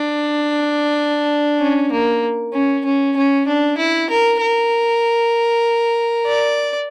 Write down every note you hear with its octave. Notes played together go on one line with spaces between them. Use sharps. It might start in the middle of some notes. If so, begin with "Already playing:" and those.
Already playing: D4
C#4
A#3
C#4
C#4
C#4
D4
E4
A#4
A#4
D5